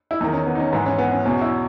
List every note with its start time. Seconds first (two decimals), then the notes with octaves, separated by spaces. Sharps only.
0.11 E4
0.20 E2 D#3 D#4
0.33 C#4
0.47 B3
0.55 D#4
0.60 C#4
0.72 G#2 E3 B3
0.86 C#4
0.98 B3
1.12 C#4
1.25 E2 B2 C#4
1.42 E4